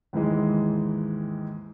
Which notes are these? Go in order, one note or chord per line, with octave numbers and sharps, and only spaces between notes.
D#2 G#2 E3 G#3